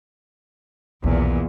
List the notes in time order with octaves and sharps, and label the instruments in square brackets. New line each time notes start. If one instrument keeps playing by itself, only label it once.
[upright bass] B1 D#3 [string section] E2 A#2